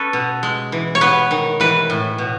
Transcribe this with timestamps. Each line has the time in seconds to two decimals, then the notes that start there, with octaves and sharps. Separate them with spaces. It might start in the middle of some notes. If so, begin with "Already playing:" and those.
Already playing: C#4 A4 B4
0.13 B2
0.43 G#3
0.72 E3
0.95 C#5
1.01 B3 B4
1.31 D#3
1.60 E3 B4
1.90 A2
2.18 B2